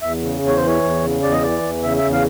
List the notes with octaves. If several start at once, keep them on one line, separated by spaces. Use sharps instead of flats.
E2 E5
C#3
E2
C#5
E3 C5
C#5
E2
C#3
E2 D5
D#5
E3 D5
E2
C#3 E5
E5
E2
F5